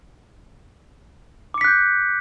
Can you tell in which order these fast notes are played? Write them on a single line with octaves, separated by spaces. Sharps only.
D6 C#7 B6 F#6 G6